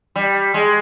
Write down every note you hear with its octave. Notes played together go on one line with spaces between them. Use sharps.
G3
G#3